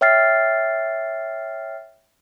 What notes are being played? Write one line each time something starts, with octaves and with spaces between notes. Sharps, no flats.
C#5 E5 G5 F6 A6 C7